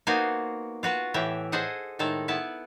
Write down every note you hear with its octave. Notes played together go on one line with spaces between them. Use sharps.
A#3 B3 D#4 F#4 C5 G#5
F4 F#4 B4 A5
A2 E3 G4 E5
G#4 A4 C5 D#5 F#5
A2 D#3 G#3 A4
B3 E4 B4 A5